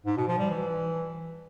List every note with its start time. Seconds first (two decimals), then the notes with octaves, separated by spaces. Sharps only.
0.06 G#2
0.17 B2
0.28 F3
0.39 G3
0.50 E3